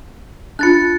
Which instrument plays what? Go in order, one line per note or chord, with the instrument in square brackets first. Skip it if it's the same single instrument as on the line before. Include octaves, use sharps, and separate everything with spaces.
[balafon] D4 F4 [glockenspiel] F#6 A6 C#7